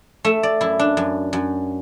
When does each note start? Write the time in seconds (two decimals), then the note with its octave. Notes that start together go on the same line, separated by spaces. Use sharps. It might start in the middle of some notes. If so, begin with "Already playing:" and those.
0.24 A3 E5
0.43 D5
0.61 F#2 E4
0.79 D4
0.97 F#2
1.33 F#2